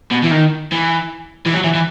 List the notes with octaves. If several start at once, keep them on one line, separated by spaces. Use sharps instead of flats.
B2
E3
D#3
E3
E3
F#3
E3
E3